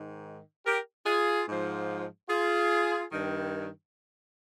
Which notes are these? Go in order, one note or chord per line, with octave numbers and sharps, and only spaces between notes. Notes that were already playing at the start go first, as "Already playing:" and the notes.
Already playing: G#2 D#3
G4 A#4
F4 G#4
G#2 F3
F4 G#4
G2 D#3